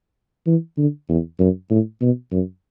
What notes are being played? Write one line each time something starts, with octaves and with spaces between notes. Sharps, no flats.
E3
D3
E2
F#2
A2
B2
F#2